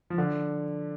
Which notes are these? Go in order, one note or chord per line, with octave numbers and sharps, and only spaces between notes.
F3
D3